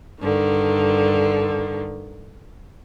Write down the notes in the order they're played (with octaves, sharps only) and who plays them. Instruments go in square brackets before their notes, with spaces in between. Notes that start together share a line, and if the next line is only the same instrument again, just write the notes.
[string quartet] G2 D3 D#3